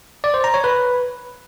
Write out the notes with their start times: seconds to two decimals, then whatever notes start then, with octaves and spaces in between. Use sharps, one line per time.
0.24 D5
0.34 C5
0.44 A#5
0.54 C#5
0.64 B4